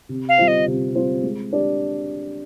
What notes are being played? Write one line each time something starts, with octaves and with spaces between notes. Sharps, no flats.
C3
F5
G3 C4 F4 C5
D#5
C3
G3 C4 F4 C5
G#3
D4 G4 D5